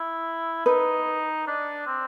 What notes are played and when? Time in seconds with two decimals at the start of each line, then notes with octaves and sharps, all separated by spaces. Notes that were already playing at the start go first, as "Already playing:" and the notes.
Already playing: E4
0.66 D#4 B4
1.47 D4
1.87 C4